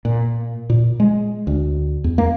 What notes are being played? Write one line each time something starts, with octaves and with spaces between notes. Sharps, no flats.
A#2
A#2
G#3
D2
E2
A#3